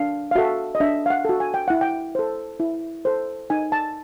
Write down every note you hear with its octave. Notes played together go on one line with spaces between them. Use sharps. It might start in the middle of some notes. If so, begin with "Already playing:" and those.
Already playing: D4 F5
F5
F#4 A4 E5
D#5
D4 E5
F5
F#5
F#4 A4
G#5
G5
E4 F#5
G5
A4 C5
E4
A4 C5
D#4 G#5
A5